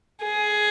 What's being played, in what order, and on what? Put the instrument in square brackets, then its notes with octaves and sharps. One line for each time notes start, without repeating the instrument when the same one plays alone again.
[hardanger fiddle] G#4